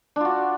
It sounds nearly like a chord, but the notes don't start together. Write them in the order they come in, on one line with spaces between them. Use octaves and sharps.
D4 F4 F#4